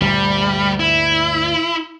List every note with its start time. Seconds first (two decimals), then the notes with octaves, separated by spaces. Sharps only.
0.01 D2 G2 A#2 G3
0.80 E4